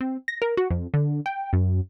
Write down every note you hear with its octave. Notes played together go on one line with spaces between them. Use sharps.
C4
A#6
A#4
F#4
F2
D3
G5
F#2